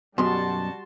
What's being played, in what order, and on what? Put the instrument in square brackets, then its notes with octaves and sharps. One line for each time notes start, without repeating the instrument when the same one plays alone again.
[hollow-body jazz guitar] F#2 B2 [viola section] G3 F#4 A5 [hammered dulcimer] C6